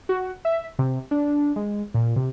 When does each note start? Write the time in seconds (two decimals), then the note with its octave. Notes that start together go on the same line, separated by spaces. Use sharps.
0.09 F#4
0.45 E5
0.79 C3
1.11 D4
1.56 G#3
1.94 A#2
2.16 C3